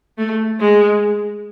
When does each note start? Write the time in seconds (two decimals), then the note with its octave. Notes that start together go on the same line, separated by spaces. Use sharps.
0.18 A3
0.60 G#3